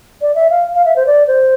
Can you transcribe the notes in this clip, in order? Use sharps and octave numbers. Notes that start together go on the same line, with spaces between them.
D5
E5
F5
F5
E5
C5
D5
C5